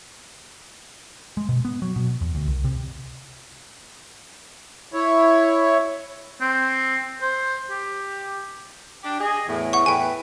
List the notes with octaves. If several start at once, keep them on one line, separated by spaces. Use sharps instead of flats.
G#3
B2
B3
F#3
B2
E2
D2
C2
C3
E4 C#5
C4
C5
G4
D4 G4
G#4 D#5
E2 A2
F#5 C#6
E2 A2 B4 G5 G#5